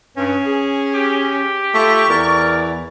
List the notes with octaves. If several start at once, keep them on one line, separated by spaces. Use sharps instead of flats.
G2 C#4
G#4
G4
A3 F4 C#6
E2 A#4 D5